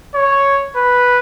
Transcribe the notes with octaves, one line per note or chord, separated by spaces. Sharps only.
C#5
B4